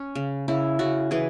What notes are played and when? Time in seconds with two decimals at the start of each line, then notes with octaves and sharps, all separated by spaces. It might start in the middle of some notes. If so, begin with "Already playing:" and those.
Already playing: C#4
0.15 C#3
0.48 C#3 E4
0.79 C#3 F#4
1.11 E3 G#4